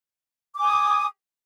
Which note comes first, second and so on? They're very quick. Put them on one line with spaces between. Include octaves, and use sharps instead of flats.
D6 G#5 D#6